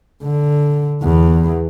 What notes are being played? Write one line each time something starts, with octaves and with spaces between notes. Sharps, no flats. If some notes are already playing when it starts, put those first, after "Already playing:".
D3
E2